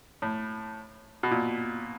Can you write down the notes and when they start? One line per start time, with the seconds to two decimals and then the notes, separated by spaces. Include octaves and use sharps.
0.22 A2
1.23 B2
1.31 A#2